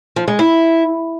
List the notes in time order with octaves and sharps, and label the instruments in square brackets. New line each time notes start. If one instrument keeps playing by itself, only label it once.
[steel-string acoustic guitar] F3
G#3
E4